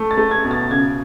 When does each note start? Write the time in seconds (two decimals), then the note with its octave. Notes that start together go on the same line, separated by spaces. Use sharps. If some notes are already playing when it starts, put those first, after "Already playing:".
Already playing: A3
0.11 A6
0.17 A3
0.31 G#6
0.45 B2
0.51 A6
0.71 C#3 G#6